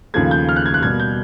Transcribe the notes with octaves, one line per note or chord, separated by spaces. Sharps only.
D#2 C#3 F3 A3 G#6
G6
F6
F#6
G#6
F#6
B2 G3 A#3 G#6
G6